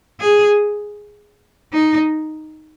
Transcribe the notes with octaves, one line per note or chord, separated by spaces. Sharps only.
G#4
D#4